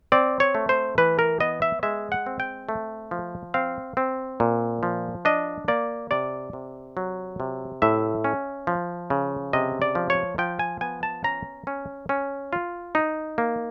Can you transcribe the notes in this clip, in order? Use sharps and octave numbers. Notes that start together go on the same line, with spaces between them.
C4 D5
C#5
A3
C5
E3 B4
A#4
B3 D#5
E5
G#3 E5
F#5
C4
G5
A3
F3
C4 F5
C4
A#2
F3
D4 D#5
A#3 D5
C3 D5
C3
F#3
C3
A2 E5
C#4
F3
C#3
C3 D#5
D5
F3
C#5
F3 G5
G#5
B3 G#5
A5
C#4 A#5
C#4
C#4
F4
D#4
A#3